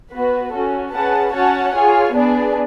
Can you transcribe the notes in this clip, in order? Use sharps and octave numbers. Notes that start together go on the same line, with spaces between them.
B3 F#4 B4
C#4 F#4 A4
C#4 G#4 B4 F#5 A5
C#4 F#4 C#5 F#5 A5
F4 G#4 C#5 G#5
B3 D4 G#4 D5